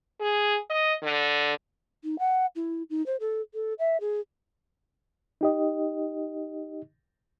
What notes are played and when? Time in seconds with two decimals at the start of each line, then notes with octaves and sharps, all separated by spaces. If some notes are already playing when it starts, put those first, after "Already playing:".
0.20 G#4
0.69 D#5
1.03 D3
2.04 D#4
2.19 F#5
2.56 E4
2.90 D#4
3.06 C5
3.20 A4
3.54 A4
3.79 E5
4.00 G#4
5.41 D#4 G4 D#5